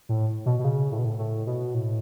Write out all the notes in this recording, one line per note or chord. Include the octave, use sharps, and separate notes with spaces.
A2
B2
B2
C#3
A2
B2
A2
A2
B2
A2